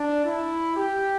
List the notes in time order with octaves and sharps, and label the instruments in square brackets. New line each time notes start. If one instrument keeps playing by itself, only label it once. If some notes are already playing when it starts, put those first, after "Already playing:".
Already playing: [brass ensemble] D4
E4
G4